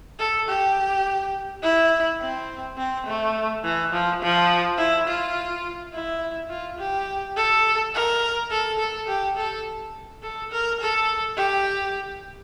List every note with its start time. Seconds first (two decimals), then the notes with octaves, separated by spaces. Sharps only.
0.19 A4
0.48 G4
1.63 E4
2.21 C4
2.78 C4
3.06 A3
3.64 E3
3.93 F3
4.22 F3
4.78 E4
5.07 F4
5.93 E4
6.50 F4
6.78 G4
7.37 A4
7.94 A#4
8.51 A4
8.79 A4
9.08 G4
9.37 A4
10.23 A4
10.52 A#4
10.80 A4
11.37 G4